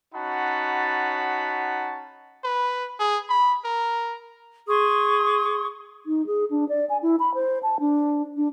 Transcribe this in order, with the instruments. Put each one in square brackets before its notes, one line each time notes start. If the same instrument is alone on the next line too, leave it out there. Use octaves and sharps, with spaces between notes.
[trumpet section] C#4 D#4 F#4 F#5 A5 B5
[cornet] B4
G#4
B5
A#4
[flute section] G#4 C6 C#6 D#6
[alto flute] D#4
G#4
D4
D5
G#5
E4
B5
C5
A5
D4
D4